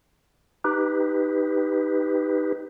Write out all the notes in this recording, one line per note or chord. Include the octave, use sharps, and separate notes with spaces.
D#4 G4 B4